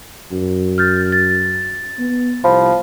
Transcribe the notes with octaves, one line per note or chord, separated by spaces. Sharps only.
F#2
F6 G6 A6
A6
B3
C2 F3 B5